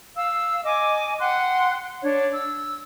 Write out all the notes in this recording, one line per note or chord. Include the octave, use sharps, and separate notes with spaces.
F5 E6
D#5 G#5 D6
F#5 G5 C6 F#6
D4 C#5
E6